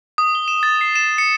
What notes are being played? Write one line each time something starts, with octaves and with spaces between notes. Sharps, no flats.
D#6
G7
E7
A6
C7
E7
C#7